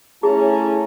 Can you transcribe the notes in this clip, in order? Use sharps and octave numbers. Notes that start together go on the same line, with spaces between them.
A3 C#4 E4 G#4 A5 A#5